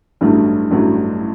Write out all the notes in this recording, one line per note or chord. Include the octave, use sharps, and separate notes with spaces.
A1 G2 F#3 A3
A1 G2 F#3 A3